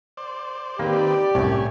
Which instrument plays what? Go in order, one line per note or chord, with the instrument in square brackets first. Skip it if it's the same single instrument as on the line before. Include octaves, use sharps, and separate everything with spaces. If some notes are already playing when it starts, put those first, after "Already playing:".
[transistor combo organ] C5 D5
[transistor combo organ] D#3 C4 B4 [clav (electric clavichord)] A#3 [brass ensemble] G4 D5
[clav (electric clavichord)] C2 F#2 [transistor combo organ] A2 C#5 G#5